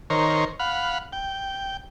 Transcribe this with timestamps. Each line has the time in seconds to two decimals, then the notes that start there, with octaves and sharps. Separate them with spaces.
0.10 D#3 A#4 C5 C#5
0.59 F5 F#5 B5
1.13 G5